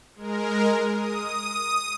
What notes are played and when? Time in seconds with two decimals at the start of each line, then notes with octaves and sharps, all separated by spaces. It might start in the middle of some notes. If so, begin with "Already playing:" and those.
0.16 G#3 A#4
0.94 D#6